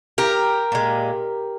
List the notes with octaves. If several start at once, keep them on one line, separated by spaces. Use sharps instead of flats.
G4 A#4
A#2 G#3